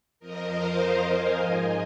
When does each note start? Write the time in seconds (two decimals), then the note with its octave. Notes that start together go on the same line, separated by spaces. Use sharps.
0.20 F2 F3 A#4 D#5
0.49 C5 F5
1.09 D#5 G#5
1.38 G#2 F3